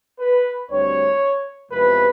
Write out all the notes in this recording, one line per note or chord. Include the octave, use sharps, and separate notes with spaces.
B4
D2 D3 G3 C4 C#5
E2 C3 F3 G#3 B4